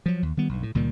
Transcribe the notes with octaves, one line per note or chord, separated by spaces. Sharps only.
F3 F#3
D#2
D#3 G3 B3
B1 G2
A2
C#2 A#2 D#3 G3